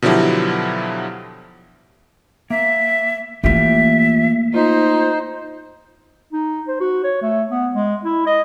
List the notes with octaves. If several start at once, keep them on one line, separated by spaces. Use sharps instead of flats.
B2 D3 F3 F#3 E4 G4
A#3 E5
E3 F3 A3 A#3 G4 E5
D#4 F4 C5
D#4
C5
F#4
C#5
A3
B3
G#3
E4
D#5